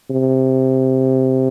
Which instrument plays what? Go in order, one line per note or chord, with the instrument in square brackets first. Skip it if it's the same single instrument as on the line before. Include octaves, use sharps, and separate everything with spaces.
[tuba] C3